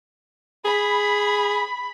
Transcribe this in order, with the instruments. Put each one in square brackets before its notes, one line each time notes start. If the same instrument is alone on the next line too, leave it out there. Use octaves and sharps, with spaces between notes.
[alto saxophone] G#4 [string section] B5